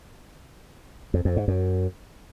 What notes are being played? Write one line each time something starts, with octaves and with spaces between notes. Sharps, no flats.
F2
F2
G#2
F#2